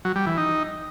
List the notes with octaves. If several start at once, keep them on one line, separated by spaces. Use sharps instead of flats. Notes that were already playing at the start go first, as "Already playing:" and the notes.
F#3
G3
E3
D#4